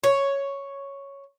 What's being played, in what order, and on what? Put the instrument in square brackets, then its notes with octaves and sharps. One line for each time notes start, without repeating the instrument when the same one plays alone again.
[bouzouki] C#5